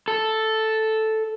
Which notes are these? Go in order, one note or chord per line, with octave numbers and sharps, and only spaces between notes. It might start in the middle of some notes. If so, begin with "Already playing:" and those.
A4